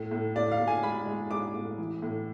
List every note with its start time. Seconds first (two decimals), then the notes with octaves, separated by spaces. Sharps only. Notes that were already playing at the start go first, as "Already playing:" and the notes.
Already playing: A2
0.11 A2
0.35 A2 D5
0.51 F5
0.59 A2
0.67 G#5
0.83 G#3 B5
1.07 G#3
1.31 G#3 D6
1.55 A2
1.78 E3
2.02 A2